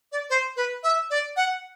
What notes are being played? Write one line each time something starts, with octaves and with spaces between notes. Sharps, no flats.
D5
C5
B4
E5
D5
F#5